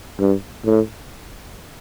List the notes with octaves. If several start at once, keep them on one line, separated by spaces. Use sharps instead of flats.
G2
A2